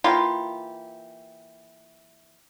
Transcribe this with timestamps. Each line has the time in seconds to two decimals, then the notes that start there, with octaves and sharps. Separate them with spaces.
0.04 E3 A#3 F4 G4